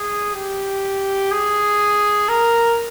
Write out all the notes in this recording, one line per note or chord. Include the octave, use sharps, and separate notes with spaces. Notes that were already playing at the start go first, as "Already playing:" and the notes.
Already playing: G#4
G4
G#4
A#4